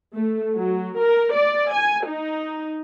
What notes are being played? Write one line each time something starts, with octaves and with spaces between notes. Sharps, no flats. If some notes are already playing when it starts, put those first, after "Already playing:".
A3
F#3
A#4
D5
G#5
D#4